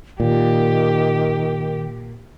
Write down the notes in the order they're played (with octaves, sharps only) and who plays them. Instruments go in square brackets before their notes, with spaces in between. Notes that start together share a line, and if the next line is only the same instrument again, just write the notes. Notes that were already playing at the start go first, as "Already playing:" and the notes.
[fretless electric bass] A#2 [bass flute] D#3 [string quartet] G4